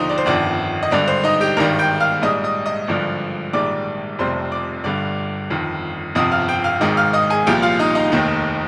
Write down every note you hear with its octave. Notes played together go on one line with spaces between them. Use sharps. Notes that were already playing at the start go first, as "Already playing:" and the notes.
Already playing: D#2 D3 F3 D#4 C5 D#5 C6
D5
C5
G1 F2 D#3 D4 D5
D#5
G#1 G2 D3 D4 D5
C5
D#4 D#5
G4 G5
G#1 G2 D#3 G3 A#4 A#5
G5 G6
F5 F6
A#1 G#2 G3 D#5 D#6
D#5 D#6
D#5 D#6
G#1 G2 D3 F3
A#1 G#2 D#3 G3 D5 D6
F1 F2 C3 G3 C5 C6
D5 D6
G1 G2 D3 G3 D5 D6
G1 F2 D#3
G1 F2 C3 F3 D#5 D#6
F5 F6
G5 G6
F5 F6
G#1 G#2 D#3 D#5 D#6
F5 F6
D#5 D#6
G#4 G#5
C2 A#2 F3 G4 G5
F4 F5
D#4 D#5
D#4 D#5
F1 D#2 D#3